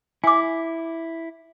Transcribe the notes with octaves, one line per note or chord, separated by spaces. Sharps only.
E4 G#5 D6